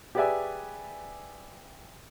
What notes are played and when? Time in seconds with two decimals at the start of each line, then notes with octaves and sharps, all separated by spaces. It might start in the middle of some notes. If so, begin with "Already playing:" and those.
0.15 G4 G#4 B4 D5 E5 G#5